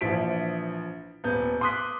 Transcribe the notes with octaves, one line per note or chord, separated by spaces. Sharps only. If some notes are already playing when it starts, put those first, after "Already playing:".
A#1 E3 F3 B6 D7
D#1 B3 G6
C6 D6 D#6 F#6 B6